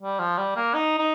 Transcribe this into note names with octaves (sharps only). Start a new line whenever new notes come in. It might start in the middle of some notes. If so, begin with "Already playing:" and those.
G3
F3
G3
A#3
D#4
D#4